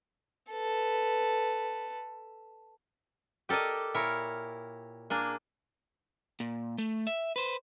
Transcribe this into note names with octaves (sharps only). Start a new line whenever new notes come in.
A4 B4
G4 A4 A#4 D5 D#5
A#2 E4 A#4 C#5
A#3 D4 G#4
A#2
A3
E5
B4 C5